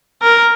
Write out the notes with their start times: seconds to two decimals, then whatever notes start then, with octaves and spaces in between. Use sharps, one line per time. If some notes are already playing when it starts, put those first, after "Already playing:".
0.22 A#4